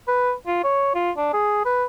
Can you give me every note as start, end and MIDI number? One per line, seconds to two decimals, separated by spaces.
0.08 0.32 71
0.47 0.59 65
0.64 0.93 73
0.95 1.11 65
1.17 1.30 62
1.33 1.64 68
1.65 1.85 71